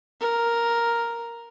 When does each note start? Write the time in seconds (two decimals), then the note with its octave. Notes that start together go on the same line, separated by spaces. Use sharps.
0.21 A#4